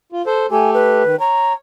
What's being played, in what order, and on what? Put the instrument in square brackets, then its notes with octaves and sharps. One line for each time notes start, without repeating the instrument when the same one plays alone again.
[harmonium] F4
A4 C5
[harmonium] A3 G4 A4 [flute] G#5
[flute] B4
[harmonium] D#3
[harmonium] C#5 [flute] A#5